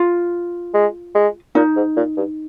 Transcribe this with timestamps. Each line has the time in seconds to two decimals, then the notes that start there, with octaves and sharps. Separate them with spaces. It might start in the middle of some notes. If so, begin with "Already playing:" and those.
Already playing: F4
0.74 G#3
1.15 G#3
1.55 A#2 D#4
1.76 G#2
1.97 A#2
2.17 G2